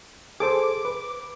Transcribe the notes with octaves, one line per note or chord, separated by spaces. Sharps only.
G#4 A4 C5 D6
B4